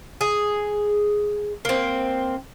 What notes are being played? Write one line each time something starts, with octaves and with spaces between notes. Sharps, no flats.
G#4
A#3 C4